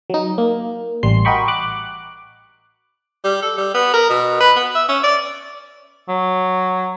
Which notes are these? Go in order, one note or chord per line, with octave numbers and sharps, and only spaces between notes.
F#3 D#4
A#3
A1 G3 C6 C7
F#4 A#4 D#5 G5 B5 C#6
D6 F#6
G3
A4
G3
B3
A#4
B2
B4
B3
E5
C#4
D5
F#3